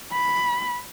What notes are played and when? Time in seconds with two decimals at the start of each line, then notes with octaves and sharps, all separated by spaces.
0.12 B5